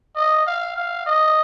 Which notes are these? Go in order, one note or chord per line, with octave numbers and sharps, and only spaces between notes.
D#5
F5
F5
D#5